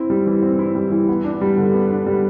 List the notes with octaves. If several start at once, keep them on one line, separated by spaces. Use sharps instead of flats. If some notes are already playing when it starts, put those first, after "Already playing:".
Already playing: C4 E4
G3
E3
C4
E4
G3
E3
B3
D4
G3
D3
B3
D4
G3